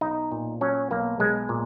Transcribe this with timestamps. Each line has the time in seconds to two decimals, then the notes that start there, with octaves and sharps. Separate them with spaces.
0.01 B1 D#4
0.32 A#2
0.61 F#3 C#4
0.91 B1 A#3
1.20 B1 G#3
1.49 A#2